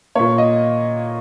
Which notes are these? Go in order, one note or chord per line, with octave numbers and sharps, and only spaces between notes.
A#2 A#3 C#5
D#5